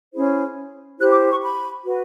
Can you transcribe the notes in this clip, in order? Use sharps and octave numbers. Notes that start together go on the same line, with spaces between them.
C#4 E4 G#4 C5
E4 G4 C5 F#6
D6
C#6
B5
F#4 B4